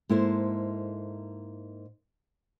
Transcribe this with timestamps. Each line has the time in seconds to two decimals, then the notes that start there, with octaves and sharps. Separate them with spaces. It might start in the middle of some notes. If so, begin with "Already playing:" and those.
0.09 G#2 A#3 E4 A4 C5